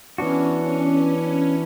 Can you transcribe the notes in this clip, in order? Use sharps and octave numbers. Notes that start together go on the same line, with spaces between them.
E3 B3 C#4 D4 F#4
C#4